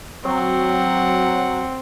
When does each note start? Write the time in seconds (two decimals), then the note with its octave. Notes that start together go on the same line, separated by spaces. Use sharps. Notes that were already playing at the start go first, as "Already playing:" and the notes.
0.25 F#3 C4 F#5